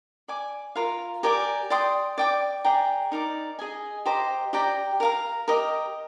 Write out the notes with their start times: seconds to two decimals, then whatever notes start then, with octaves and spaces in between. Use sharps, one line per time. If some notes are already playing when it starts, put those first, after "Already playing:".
0.28 D5 G#5 D6
0.76 F4 A#4 F5
1.23 G4 A#4 D5 G#5
1.70 D5 G5 C6 D#6
2.18 D5 G5 D6
2.64 G#4 D5 G5 A#5
3.12 D#4 A#4 D5
3.59 G#4 D#5 G#5
4.05 G4 C5 D#5 A#5
4.53 G4 D5 G5 A#5
5.00 A#4 F5 A#5
5.48 G4 A#4 D#5